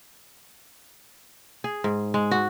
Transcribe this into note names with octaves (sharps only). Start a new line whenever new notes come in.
G#4
G#2
G#3
F#4